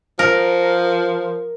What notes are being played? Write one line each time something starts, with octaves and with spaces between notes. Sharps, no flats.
F3 A#4